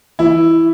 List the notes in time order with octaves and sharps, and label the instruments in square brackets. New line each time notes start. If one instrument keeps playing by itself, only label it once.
[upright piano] E3 [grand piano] E4